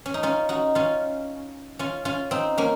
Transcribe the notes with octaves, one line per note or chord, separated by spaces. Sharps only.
C#4
D#4
C#4 F4
D#4 F#4
C#4 F4
C#4 F4
C#4 F4
C4 D#4
A#3 C#4